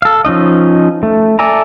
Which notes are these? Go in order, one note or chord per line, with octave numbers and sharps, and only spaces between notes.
A4 F5
F3 C#4 D#4 D#5
A3
A4 D5 E5 G#5 A#5